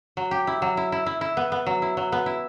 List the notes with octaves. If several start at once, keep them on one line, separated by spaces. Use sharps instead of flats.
F#3
G4
E4
F#3
E4
E4
E4
E4
B3
B3
F#3
E4
F#3
B3
E4